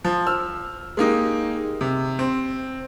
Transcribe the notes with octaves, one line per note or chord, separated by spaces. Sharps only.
F3
E6 F6
G#3 A#3 D#4 G4
C3
C4